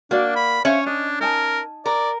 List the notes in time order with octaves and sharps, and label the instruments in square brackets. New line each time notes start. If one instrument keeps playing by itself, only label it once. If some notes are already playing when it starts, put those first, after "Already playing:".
[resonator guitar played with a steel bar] A#3 [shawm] D4 [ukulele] F#4 D5 F5
[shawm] B5
[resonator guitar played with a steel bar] C#4 [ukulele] C5 E5 F5 [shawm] C#5
[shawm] D4 [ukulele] D#5
[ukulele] D#4 G#5 A5 [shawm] A#4
[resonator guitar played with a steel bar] A#4 [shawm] D5